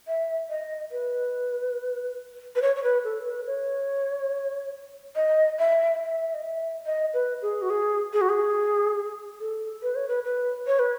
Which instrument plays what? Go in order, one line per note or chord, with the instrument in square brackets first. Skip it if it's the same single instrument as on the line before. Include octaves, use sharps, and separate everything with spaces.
[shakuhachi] E5
D#5
B4
B4
C#5
C#5
B4
A4
B4
C#5
D#5
E5
E5
D#5
E5
D#5
B4
G#4
F#4
G#4
G#4
F#4
G#4
A4
B4
C#5
B4
B4
C#5
B4